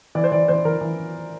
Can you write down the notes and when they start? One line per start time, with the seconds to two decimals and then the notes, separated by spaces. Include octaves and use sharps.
0.15 E3 D5
0.24 C5
0.32 E3 D5
0.48 E3 C5
0.65 E3 A#4
0.81 E3